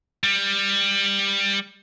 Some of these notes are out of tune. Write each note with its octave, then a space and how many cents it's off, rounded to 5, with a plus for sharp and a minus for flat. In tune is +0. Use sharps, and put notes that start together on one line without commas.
G3 +15